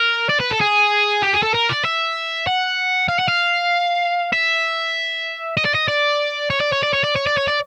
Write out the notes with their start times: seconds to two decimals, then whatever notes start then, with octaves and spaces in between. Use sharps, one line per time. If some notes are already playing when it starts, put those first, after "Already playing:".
Already playing: A#4
0.29 D5
0.40 B4
0.51 A4
0.61 G#4
1.23 G4
1.34 G#4
1.43 A4
1.54 A#4
1.69 D5
1.85 E5
2.47 F#5
3.09 F5
3.19 F#5
3.28 F5
4.33 E5
5.57 D#5
5.65 D5
5.75 D#5
5.88 D5
6.50 C#5
6.60 D5
6.72 C#5
6.83 D5
6.93 C#5
7.04 D5
7.16 C#5
7.27 D5
7.37 C#5
7.48 D5